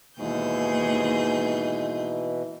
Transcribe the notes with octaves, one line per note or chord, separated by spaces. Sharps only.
D#2 G#2 B2 E3 G#4 G6